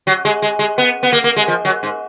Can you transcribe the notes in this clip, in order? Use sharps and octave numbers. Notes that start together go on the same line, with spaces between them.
F#3
G#3
G#3
G#3
B3
B3
A#3
A#3
G#3
F3
F#3
G#2